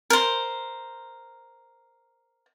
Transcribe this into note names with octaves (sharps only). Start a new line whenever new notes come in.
A#4 C5